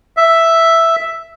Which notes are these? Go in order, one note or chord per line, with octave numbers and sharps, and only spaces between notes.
E5